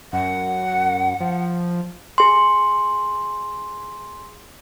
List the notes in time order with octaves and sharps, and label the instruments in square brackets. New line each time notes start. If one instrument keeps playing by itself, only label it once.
[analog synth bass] F#2 [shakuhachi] F#5
[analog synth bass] F3
[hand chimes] G#4 C6